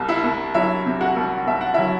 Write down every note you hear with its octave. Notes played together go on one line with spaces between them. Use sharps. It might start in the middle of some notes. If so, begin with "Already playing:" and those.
Already playing: C2 C3
E4 E5
C2
F#3 E4 E5
C3
F#4 F#5
C2
C2 E5
F#5
F#3 E4 E5